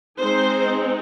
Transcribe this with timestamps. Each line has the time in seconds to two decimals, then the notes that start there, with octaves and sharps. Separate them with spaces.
0.19 G#3 C4 D#4 C5